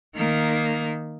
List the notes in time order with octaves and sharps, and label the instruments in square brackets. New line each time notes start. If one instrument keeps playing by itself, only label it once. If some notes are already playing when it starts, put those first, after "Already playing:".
[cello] D#3 A#3